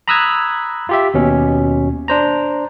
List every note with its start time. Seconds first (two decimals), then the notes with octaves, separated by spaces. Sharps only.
0.08 A#5 B5 D#6 E6 F#6 G#6
0.89 F4 G4 E5
1.14 D#2 B2 C#4
2.08 D4 C5 A#5